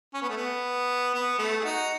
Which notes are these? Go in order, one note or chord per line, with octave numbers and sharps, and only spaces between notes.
C#4
B3
A3
B3
B3
A3
G#4
D#4 F#4